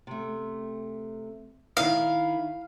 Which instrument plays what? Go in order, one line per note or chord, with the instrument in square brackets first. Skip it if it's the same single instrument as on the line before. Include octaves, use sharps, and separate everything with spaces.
[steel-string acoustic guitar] C3 A3
[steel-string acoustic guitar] D#3 D#4 E4 [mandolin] F5